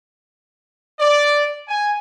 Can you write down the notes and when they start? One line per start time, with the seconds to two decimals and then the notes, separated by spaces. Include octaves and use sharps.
1.00 D5
1.68 G#5